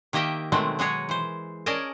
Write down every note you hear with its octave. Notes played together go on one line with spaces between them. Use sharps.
D#3 A#3 G4 D#5 E5 G5
B2 D#3 F#3 G#3 A3 C4
F#3 G#3 D#4 G#4 C#5
E3 C5
C#4 G#4 A#4 D5 D#5 A5